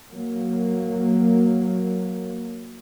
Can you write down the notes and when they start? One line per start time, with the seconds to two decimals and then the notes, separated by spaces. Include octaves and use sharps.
0.13 F#3 A#3